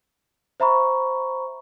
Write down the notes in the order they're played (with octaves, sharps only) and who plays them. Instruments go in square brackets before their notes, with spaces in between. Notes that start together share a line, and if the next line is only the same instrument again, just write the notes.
[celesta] C5 E5 A#5 B5 C#6